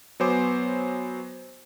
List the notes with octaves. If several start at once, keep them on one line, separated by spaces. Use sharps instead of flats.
F#3 B3 C5 G#5 D6